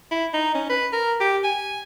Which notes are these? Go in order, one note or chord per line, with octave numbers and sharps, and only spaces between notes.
E4
D#4
C#4
B4
A#4
G4
G#5